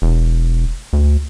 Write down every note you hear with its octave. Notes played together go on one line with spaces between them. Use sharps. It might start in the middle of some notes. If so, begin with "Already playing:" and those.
E1
D2